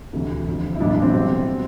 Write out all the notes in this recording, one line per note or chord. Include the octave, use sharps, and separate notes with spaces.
D2 C3 E3
F1 F2 D3
E4
B1 A2 E3 D4
D4
C4
C2 B2 C4
B2